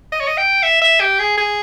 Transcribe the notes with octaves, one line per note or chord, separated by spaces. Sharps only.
D#5
C#5
D#5
G5
E5
E5
G4
G#4
G#4